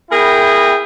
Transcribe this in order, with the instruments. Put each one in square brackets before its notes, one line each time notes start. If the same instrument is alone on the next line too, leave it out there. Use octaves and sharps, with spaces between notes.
[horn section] B3 E4 G#4 A#4 G5